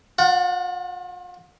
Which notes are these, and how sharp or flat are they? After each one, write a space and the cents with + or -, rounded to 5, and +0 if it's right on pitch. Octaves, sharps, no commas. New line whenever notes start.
F4 +40 F#5 +0